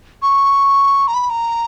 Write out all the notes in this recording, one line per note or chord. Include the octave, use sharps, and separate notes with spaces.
C#6
A#5
B5
A#5